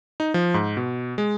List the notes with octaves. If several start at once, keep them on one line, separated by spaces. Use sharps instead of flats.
D#4
F3
G#2
B2
G#3